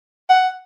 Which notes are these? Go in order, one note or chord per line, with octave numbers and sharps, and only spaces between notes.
F#5